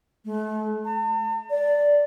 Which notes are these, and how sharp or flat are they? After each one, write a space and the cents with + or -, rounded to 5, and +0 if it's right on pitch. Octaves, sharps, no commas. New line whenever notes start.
A3 -40
A5 +45
D5 -10